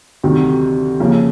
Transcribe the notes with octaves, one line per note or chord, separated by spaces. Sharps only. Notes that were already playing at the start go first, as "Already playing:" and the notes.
D2 C3 D#3 F#3
C#3 F3 A#3 C#4